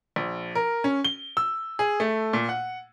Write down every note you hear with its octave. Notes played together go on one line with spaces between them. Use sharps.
A#1
A#4
C#4
G7
E6
G#4
A3
A#2
F#5